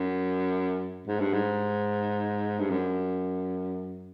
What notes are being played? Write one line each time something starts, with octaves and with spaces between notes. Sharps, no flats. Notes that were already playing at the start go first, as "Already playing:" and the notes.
Already playing: F#2
G#2
G2
G#2
G2
F#2